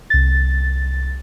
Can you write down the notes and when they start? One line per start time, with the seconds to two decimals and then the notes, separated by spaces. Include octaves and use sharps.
0.10 C2 A6